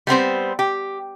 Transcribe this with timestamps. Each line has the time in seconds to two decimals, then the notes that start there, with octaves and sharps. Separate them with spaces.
0.07 G3 B3 C4 C5
0.59 G4